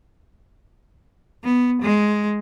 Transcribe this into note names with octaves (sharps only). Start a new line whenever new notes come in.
B3
G#3